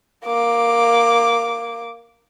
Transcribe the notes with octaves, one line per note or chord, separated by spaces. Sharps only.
A#3 D6